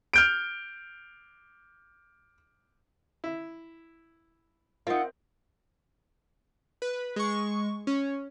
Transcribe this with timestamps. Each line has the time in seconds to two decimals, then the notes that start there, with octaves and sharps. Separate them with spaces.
0.13 F6 G6 D7
3.24 E4
4.87 C4 D#4 F4 A#4 E5 F#5
6.82 B4
7.16 G#3 C#6
7.87 C#4